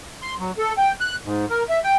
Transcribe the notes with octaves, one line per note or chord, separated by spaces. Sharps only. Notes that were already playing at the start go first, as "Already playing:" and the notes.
C6
F#3
A4
G5
F#6
G#2
A#4
E5
G5